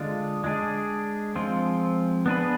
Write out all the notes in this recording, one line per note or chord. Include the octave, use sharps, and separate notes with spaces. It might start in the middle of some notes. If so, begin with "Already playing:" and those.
Already playing: D3 G#3 D4 F4
G#3 D4 G#4
F3 G#3 C4 F4
B3 D4 G#4 B4